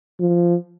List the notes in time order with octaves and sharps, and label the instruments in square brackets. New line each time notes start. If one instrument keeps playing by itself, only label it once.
[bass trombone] F3